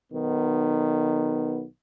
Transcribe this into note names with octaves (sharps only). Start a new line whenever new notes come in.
B1 D#3 B3